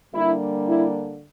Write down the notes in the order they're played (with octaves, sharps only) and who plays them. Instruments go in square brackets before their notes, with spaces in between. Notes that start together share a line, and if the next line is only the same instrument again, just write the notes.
[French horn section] D3 G3 A#3 D4 E4
E4